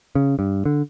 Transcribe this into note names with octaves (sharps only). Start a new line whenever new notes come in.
C#3
G2
D3